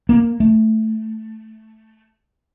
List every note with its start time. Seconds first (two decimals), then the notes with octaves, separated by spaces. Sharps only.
0.09 A#3
0.40 A3